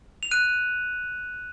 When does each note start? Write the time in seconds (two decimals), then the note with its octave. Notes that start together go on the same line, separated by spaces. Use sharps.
0.23 F7
0.31 F#6 D#7